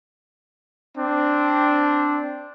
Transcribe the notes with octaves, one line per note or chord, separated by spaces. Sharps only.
C4 D4